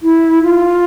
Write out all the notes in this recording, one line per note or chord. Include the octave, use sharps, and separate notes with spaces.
E4
F4